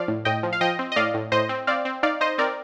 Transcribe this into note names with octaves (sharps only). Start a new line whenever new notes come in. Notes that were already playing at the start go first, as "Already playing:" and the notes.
Already playing: F3 D5 F5
A2
A2 D#5 G5
F3
F5
F3 D#5 G5
C4
D#5
A2 D5 F5
A2
A2 C5 D#5
C4
C4 D5 F5
C4
D#4 D5 F5
D#4 C5 D#5
C4 A#4 D5